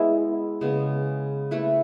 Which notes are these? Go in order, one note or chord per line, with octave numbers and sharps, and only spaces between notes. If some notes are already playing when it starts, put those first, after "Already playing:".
Already playing: G#3 B3 E4
C#3 G#3 B3
A3 E4 B4